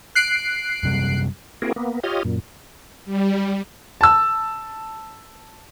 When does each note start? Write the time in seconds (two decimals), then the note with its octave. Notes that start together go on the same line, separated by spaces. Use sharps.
0.15 F#6 C7 D7
0.83 F#2 C3 G3
1.62 A#3 C4 E4 F#4 G#4 A#4
1.76 A#3 B3
2.04 F4 G4 C#5 D#5 D#6 F6
2.24 F#2 A#2
3.05 G3
4.01 A5 E6